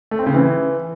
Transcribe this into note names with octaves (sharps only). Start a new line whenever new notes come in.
A3
C4
C#3
E3